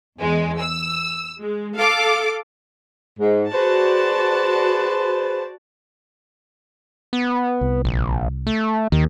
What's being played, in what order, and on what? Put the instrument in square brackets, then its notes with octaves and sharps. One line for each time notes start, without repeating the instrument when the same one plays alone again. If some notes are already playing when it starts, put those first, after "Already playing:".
[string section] E2 G#3
E6
G#3
A4 F5 D6
[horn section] G#2
[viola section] F#4 D5 A5 [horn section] G#4 B4 C5
[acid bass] B3
[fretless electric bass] C2
[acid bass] A#1
A3
[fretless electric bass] D#2 [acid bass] D#3